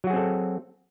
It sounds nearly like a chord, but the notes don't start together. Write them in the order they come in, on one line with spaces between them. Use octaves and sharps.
F#3 F#4 G#4 C4 A4